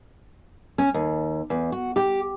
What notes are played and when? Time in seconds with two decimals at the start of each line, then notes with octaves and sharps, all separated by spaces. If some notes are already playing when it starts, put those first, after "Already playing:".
0.78 C#4
0.94 D#2
1.50 E2
1.72 F#4
1.96 G4